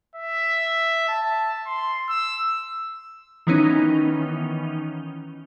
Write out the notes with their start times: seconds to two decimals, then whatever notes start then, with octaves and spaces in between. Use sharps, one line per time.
0.15 E5
1.08 A5
1.67 C6
2.09 E6
3.47 D#3 E3 B3 C#4 D#4